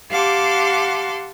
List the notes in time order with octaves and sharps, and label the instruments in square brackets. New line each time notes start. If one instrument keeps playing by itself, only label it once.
[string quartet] G4 F5 F#5 A5 C6 D6